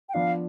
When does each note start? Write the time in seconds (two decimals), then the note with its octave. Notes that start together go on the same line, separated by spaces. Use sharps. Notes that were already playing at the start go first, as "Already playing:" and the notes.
0.09 G5
0.14 F3 B3 D4 F4 F5